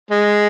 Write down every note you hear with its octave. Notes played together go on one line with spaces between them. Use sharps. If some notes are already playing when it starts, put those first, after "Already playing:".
G#3